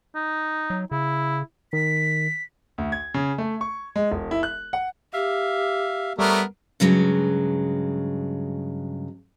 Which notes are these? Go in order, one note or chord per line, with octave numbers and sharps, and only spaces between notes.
D#4
F#3
C#3 E4
D#3 B6
D2
G#6
C#3
A3
C#6
G#3
E1
E4
F#6
F#5
G4 E5 F5
G3 A3 B3 A#4 C#5 E5 D6
G2 C#3 F#3 G#3